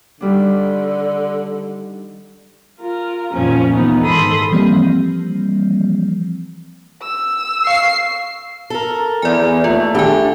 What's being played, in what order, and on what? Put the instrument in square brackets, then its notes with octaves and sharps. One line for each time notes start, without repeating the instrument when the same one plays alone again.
[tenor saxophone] D3 [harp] D#3 G3 D4
[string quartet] F4 A#4
F2 A#2 D#3 F3 C#4
D2 E3 B3 D#4
G#2 D#3 A4 B5 C6 D#6
[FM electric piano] E3 F3 G3 A#3 C4
[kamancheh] E6
[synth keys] F5 C#6 [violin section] C7
[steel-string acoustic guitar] A4 A#4
[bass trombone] E2 [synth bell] D5 G#5
[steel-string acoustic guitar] D#2 [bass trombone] A3 [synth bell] F4
[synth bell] D#3 G#5 [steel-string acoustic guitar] D4 G4